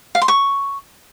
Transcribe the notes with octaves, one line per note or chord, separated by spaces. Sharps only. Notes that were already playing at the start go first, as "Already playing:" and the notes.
F5
C6
C#6